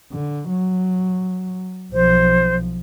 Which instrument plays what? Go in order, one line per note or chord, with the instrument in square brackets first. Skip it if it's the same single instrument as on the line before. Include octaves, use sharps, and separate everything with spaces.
[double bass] D3
F#3
[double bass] B1 F3 [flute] C5